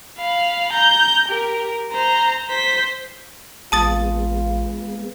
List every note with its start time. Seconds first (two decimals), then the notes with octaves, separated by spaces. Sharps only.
0.18 F5 B5
0.72 A#5 G6
1.28 G4 A#4
1.92 C5 A#5
2.49 C5 B6
3.72 A1 G#3 B3 F4 A5 D#6 A6